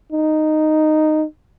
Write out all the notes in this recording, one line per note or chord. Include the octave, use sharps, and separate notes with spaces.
D#4